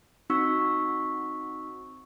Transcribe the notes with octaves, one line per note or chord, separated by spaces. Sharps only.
C4 D#4 F#4 C#6 E6 B6